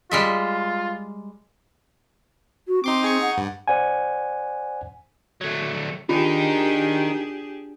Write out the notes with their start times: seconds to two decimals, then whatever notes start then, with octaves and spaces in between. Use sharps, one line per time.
0.11 G3 G#3 F4 E5
2.68 F#4
2.84 C4 D#4 C6 D6
3.02 D#4 G#4 C#6
3.21 F#5
3.38 G2
3.68 C5 D5 F#5 G#5
5.41 F#3 A3
6.09 D4 D#4 F4 G4 G#4 A#4